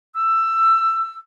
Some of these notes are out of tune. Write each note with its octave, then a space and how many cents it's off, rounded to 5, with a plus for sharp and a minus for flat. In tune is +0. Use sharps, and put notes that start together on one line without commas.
E6 +15